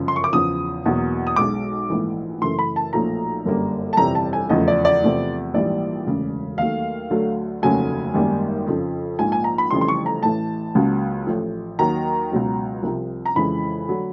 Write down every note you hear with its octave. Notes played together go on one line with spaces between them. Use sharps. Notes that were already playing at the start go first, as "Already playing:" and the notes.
Already playing: G1 F#2 C#3 F3
C6
C#6
D6
E2 C#3 F3 D#6
E2 B2 F#3 A#3
D#6
B1 B2 G#3 D6
A#1 G#2 E3 A3
F#2 C#3 E3 A3 C6
B5
A5
B1 A#2 F3 A3 A#5
G1 F#2 D3 G3 A#3
A5
G1 F2 C3 E3 G3 A#5
A5
G#5
F1 E2 C#3 F3 A3 D#5
D5
D5
E2 C3 F3 A3
A#1 G#2 E3 G3 A#3 D5
E1 D2 C#3
D#2 D#3 F#3 A3 F5
D2 D3 F#3 A3
F1 D#2 C#3 F#3 A3 G#5
G#1 F#2 D#3 G3 A#3
F2 C#3 F3
A#1 G#2 F3 A#3 G#5
G#5
A#5
B5
F1 F2 C#3 E3 G3 C6
C6
C#6
A#5
A1 A2 E3 A5
C#2 C#3 F#3 A#3
A1 A2 F3 A3
D#2 D#3 F#3 A#5
C#2 B2 F#3
C2 C3 F3
A#5
F2 C#3 E3 G#3 B5
D3 F#3 A3